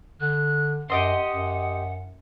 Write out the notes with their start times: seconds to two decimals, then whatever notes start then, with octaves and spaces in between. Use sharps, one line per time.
0.21 D3 F#6
0.90 F#2 G4 D#5 F#5 C6
1.28 F#2